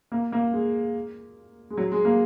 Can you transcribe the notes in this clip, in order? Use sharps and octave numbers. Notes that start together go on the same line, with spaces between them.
A#3
A#3
G#3
G#3
F#3
G#3
A#3